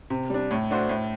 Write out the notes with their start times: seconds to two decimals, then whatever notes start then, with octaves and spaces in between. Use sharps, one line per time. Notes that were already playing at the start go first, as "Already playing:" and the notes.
0.10 C3
0.30 G3 D4
0.51 A2
0.70 A3 D4 F#4 C5
0.89 A2